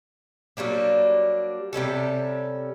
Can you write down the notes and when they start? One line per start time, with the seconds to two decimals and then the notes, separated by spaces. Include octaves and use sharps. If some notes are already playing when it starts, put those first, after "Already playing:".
0.57 F#3 G3 A#3 D4
1.73 C3 G3 C#4 A4